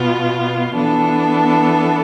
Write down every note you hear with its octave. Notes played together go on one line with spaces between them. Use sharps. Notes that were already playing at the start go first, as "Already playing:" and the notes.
Already playing: B2 B3 F4
E3 B3 D4 A4